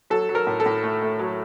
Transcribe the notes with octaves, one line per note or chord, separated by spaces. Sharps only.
F#3 A4
F#3
A#4
A2
A4
A2
A3
A3
F#3